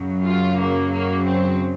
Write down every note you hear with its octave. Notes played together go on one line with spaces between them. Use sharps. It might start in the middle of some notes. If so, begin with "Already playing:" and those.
Already playing: F#2 C#3 F#3
F4
A#3
A#3
C4